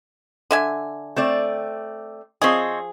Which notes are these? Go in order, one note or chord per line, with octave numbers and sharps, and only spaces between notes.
D3 E5 G#5
A3 C4 D5
F3 C4 G#4 C#5 D#5